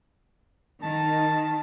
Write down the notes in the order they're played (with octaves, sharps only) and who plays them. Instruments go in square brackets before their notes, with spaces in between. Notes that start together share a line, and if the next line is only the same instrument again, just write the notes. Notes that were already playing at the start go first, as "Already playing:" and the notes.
[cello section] D#3 [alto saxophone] A5